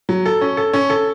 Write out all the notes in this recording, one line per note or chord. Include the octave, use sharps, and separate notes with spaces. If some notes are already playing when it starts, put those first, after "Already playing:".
F#3
A4
C#4
A4
C#4
A4